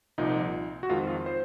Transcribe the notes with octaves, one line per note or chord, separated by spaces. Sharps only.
C2 A#2 F3 D#4
F#4
F2 D#3 G#3 C4 F4
F4
C5